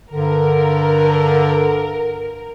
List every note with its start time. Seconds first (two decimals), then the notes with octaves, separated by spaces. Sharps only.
0.12 G2 D3 A#4